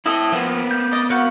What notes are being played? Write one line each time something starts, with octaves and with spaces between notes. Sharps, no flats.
C4 E4 A4 D#5 E6
F3 A#3 B3
G6
D5 D#5
F#4 A#4 F5 F#5 G6